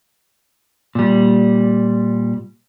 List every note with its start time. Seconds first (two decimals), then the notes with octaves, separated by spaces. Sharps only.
0.95 A#2 G3